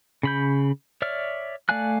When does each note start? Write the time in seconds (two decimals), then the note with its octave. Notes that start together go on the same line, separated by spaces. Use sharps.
0.23 C#3 B5 G6
1.02 C#5 D5 E5 F6
1.69 A3 D5 F5 G#5 F#6